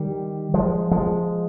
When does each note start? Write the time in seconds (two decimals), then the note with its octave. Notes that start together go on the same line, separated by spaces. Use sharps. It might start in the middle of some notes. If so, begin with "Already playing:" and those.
Already playing: D#3 G3
0.54 F3 G#3
0.91 F3 G#3